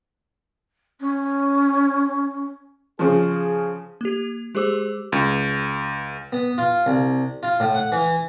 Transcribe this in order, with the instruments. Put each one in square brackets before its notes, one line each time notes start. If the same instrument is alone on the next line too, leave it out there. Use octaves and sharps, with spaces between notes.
[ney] C#4
[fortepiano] C#3 F3 [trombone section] G#4
[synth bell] A#3 G4
G#3 G4 G#4 C5 D6 E6
[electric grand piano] C#2
[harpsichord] B3
F4
C2
F4
A2
F#5
E3